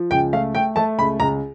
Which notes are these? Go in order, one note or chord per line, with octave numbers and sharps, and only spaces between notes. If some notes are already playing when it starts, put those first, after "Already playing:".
Already playing: F3
C#2 G5
A3 F5
A3 G5
A3 A5
C#2 B5
C#2 A#5